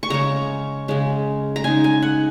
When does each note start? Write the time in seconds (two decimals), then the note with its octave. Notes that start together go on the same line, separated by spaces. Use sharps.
0.03 C#6
0.10 C#3 G#3 C#4 A#5
0.88 C#3 G#3 C#4
1.56 A#5
1.64 C#3 G#3 D#4 G#5
1.84 G#5
2.02 F#5